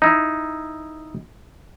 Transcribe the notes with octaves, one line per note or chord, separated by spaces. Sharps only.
D#4 E4